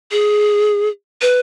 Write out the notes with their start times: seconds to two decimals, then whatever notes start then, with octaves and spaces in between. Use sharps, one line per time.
0.11 G#4
1.22 B4